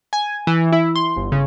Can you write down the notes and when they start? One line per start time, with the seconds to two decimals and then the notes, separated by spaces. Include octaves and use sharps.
0.13 G#5
0.47 E3
0.72 E4
0.96 C6
1.17 G1
1.32 C#3